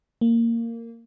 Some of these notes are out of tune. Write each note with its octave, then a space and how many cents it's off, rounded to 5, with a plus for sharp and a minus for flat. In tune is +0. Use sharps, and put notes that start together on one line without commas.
A#3 -15